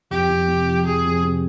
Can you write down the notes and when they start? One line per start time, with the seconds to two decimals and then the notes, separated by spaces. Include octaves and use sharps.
0.11 F2 G4
0.29 F2
0.48 C3
0.68 F3
0.86 F2 G#4
1.05 F2
1.24 C3